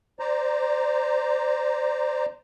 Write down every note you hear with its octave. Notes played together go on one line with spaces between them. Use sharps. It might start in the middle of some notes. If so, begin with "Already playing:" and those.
C5 D5 A#5